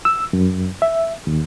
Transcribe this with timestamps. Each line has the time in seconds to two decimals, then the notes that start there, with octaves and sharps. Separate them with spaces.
0.05 E6
0.33 F#2
0.82 E5
1.27 D#2